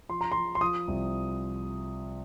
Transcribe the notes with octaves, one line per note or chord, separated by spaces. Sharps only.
F3 C6
A#5
F3 C6
C6
F3 D#6
C2